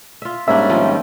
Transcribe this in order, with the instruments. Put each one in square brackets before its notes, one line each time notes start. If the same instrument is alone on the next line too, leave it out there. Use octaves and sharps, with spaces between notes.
[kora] F4 E5
[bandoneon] G#2 G3 C#4 [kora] A#3 D4 [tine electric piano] E5
[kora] D#3 F3 C4